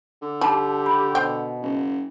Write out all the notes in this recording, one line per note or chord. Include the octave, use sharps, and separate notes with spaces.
D3
G3 D#4 G4 A5 D6
B5
B2 C5 G5
F#1